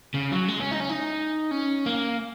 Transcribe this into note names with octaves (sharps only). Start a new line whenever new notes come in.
C#3
F#3
G#3
C#4
D#4
C#4
D#4
C#4
A#3